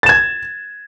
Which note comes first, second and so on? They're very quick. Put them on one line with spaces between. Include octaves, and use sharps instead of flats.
A6 E7 G#6